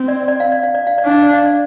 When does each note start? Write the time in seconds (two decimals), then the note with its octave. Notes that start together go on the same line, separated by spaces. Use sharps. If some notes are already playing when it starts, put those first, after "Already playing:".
Already playing: C4
0.08 D5
0.28 D5
0.40 F5
0.52 D5
0.63 F5
0.75 D5
0.87 F5
0.98 D5
1.05 D4 F5
1.22 D5
1.33 F5
1.46 D5